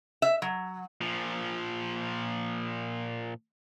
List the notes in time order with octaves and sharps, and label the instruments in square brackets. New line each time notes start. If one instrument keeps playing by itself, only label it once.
[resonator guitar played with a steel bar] E5
F#3
[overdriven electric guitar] A#2 F3